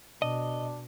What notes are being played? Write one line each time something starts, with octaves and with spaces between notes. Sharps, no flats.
B2 D4 D#5